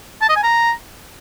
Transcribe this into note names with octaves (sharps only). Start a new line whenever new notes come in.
A5
D#5
G#5
A#5